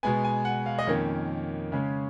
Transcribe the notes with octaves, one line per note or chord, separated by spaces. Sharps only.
B2 G#3 B3 G#5
G#5
F#5
F5
D#5
F2 D#3 A#3 C#4 C#5
C#3 G#3 C#4